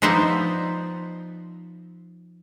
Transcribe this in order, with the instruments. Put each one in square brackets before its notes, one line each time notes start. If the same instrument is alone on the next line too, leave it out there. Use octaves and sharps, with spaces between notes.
[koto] F3 B3 D#4 C5 D5 E5